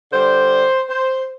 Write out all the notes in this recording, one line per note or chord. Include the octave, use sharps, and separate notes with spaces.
D3 G3 C5
C5